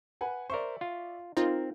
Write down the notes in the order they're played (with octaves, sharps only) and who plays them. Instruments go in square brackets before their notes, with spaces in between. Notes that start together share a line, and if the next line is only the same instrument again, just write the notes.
[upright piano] B4 F#5 G#5
[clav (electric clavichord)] A#4 C5 [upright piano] D5 E5 C#6
[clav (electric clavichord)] F4
[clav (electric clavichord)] C4 [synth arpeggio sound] D#4 F4 [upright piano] A#4